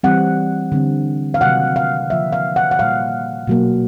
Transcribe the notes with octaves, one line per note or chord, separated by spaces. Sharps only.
E3 G3 C4 F#5
D3 G3 C4
F5
C3 D#3 F#3 A#3 F#5
F5
D3 F3 A#3 E5
F5
F#5
F#5
A#2 G3 A#3 F5
B2 F#3 A#3